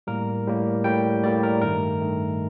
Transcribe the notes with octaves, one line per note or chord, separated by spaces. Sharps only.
A2 G3 A#3 A#4
A2 G3 A#3
A2 G3 A#3 G5
A2 G3 A#3 D5
A#4
G2 D#3 A3 A#4
G2 D#3 A3